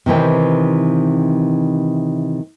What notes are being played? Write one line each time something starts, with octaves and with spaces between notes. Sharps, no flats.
C3 D#3 E3 C4